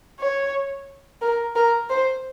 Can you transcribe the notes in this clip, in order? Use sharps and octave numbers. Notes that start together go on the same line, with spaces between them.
C#5
A#4
A#4
C5